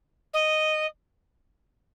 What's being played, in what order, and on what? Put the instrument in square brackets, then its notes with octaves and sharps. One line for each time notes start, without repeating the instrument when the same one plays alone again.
[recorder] D#5